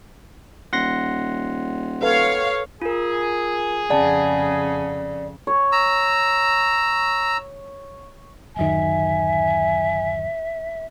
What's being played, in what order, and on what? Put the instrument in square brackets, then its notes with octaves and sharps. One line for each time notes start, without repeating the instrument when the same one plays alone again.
[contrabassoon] D#1 [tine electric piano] F#5 C6 A#6
[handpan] A4 B4 [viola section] C#5 F5
[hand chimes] F4 A#4 [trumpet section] G#4
[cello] F2 C#3 [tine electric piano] D5 [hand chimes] F#5 A5
[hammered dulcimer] C#5
[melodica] A#5 E6
[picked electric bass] D1 F#2 D#3 [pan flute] E5 [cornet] G#5